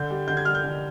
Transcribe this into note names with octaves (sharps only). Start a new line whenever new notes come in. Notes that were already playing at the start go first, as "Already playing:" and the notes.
Already playing: D3 G6
G3
D3 G6
G#6
G3 F6
G6
D3